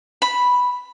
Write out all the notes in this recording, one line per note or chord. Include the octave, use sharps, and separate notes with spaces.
B5